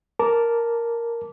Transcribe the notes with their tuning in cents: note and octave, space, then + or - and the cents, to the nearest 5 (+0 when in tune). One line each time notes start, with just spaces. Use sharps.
A#4 +0 A5 +0 D6 -15